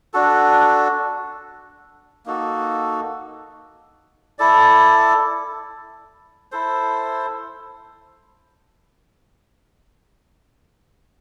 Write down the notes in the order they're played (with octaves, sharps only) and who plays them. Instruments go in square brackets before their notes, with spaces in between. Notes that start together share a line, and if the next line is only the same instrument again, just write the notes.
[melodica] D4 F#4 A4
A#3 D#4 F#4 A4
E4 A4 D5
E4 A4 C5